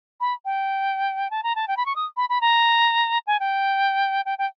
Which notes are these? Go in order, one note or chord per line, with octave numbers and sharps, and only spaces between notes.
B5
G5
A5
A#5
A5
G5
B5
C#6
D#6
B5
B5
A#5
G#5
G5
G5
G5